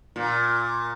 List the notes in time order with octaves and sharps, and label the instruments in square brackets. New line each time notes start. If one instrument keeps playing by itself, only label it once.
[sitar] A#2